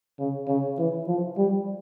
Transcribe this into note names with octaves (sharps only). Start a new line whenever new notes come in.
C#3
C#3
E3
F3
G3